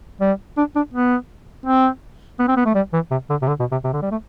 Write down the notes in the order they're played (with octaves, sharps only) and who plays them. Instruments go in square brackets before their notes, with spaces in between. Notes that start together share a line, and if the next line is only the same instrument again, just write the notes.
[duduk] G3
D4
D4
B3
C4
B3
C4
B3
A3
G3
E3
C3
D3
C3
D3
B2
C3
C3
D3
G3
A3